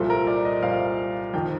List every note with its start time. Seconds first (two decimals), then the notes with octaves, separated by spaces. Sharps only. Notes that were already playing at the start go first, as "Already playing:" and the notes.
Already playing: C2 A#2 F3 A4
0.10 A#4
0.27 D5
0.45 D#5
0.62 C2 A#2 F3 F5
1.33 F2 D#3 G5